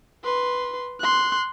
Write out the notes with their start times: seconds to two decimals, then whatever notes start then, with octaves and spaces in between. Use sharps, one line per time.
0.24 B4 C6
1.00 C6 F#6